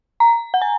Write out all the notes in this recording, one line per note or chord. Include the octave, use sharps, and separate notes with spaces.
A#5
F#5
G#5